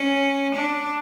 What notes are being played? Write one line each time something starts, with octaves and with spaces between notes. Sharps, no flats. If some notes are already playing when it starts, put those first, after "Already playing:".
Already playing: C#4
D4